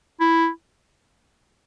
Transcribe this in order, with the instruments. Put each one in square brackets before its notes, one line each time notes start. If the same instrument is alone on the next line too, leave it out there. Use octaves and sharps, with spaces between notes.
[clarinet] E4